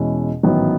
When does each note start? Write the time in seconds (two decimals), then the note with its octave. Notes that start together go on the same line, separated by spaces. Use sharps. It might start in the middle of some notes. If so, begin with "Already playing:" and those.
Already playing: E2 B2 G#3 C#4 E4
0.43 A1 G#2 D#3 F#3 B3